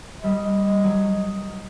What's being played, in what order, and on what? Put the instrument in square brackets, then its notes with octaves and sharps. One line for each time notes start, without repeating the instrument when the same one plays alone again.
[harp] G3 [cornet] D#5
[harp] F#3